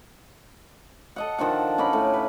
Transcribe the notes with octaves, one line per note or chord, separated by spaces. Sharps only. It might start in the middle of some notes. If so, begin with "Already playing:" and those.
A4 D#5 F#5
D#3 F3 D4 F#5
C#4 D#4 D5 B5
A2
B4